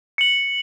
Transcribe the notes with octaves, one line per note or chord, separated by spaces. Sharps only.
C#7 F#7